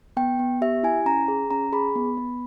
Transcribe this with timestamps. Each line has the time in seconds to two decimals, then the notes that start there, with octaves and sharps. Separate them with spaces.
0.17 B3 G5
0.39 B3
0.61 G4 E5
0.83 E4 G#5
1.06 C#4 A#5
1.28 G#4
1.51 C#4 A#5
1.72 G#4 B5
1.96 B3
2.17 B3